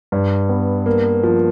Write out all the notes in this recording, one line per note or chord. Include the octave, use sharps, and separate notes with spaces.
G2
B3
A#3
F3